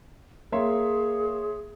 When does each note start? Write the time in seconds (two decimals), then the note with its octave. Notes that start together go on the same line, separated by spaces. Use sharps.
0.52 A#3 G#4 C#5 E5 C6